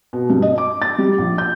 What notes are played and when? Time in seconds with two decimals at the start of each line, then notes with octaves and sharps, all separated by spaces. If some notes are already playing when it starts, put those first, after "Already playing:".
0.13 B2
0.30 G2
0.42 D#5
0.58 D6
0.82 A6
0.98 G3
1.18 A#1
1.38 G6